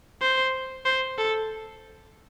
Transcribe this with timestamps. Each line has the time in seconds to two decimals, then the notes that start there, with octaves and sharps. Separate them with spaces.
0.22 C5
0.85 C5
1.18 A4